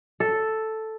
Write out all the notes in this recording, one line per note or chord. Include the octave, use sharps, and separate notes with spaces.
A4